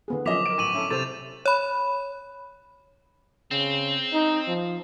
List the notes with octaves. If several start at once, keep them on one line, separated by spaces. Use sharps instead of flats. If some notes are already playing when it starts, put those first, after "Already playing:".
D3 B3 G#4
F3 F#3 A#3 C#4 D#5 D6 B6 F7
A#4 D7
A1 C#6 D#7 F#7
C#4 E4 A4
C3 A4 C5 A6 F7
C#5 B5
C#3 C4
D#4
F3